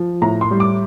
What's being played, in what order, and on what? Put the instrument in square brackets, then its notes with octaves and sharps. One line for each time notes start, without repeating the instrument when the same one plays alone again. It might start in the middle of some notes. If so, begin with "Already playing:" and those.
Already playing: [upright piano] F3
A2 A#5
C6
G3
D6